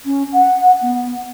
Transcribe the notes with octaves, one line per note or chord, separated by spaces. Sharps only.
C#4
F#5
B3